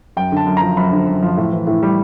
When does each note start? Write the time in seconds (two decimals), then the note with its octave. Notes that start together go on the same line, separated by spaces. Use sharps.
0.17 F#2 G5
0.32 D3 A5
0.46 F#2
0.57 A#5
0.62 F3
0.77 F#2 B5
0.92 D3
1.07 F#2
1.23 F3
1.37 A2
1.53 E3
1.67 A2
1.83 G3